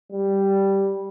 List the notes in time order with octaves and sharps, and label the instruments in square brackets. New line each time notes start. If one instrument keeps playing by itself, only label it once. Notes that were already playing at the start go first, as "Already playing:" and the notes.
[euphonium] G3